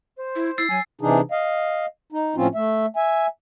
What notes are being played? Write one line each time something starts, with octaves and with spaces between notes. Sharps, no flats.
C5
E4
E4 E6 A6 C7
F#3 G#5
C3 E3 D4 D#4 G#4
D#5 F5
D#4
A2 F3 C4 C#4 F4
A3 E5
E5 G#5